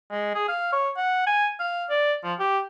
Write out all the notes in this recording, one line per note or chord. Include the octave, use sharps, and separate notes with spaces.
G#3
G#4
F5
C#5
F#5
G#5
F5
D5
F3
G4